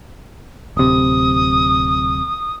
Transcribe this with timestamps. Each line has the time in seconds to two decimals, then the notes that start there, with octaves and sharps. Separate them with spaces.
0.77 D1 C3 D#6